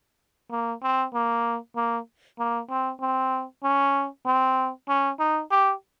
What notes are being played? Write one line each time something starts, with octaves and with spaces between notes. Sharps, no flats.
A#3
C4
A#3
A#3
A#3
C4
C4
C#4
C4
C#4
D#4
G4